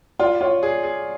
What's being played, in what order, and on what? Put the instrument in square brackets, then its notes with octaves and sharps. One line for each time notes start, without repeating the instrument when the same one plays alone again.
[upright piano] F4 [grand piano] D5
[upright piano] F4 [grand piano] C#5
[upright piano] G#4
G#4